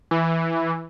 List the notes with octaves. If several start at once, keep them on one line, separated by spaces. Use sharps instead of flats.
E3